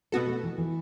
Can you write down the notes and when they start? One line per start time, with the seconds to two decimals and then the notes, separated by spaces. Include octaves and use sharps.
0.12 B2 A3 B3 F#4 A4
0.27 A3
0.43 E3
0.58 E3